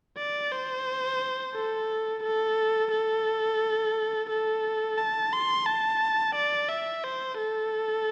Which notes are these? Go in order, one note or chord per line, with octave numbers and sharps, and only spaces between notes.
D5
C5
A4
A4
A4
A4
A5
C6
A5
D5
E5
C5
A4